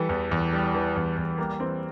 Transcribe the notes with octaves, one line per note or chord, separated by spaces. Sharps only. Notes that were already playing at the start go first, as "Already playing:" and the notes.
Already playing: E3 G3 A4
E2
E2
G3
E3
E2
E2
G3 A#3
E3 C4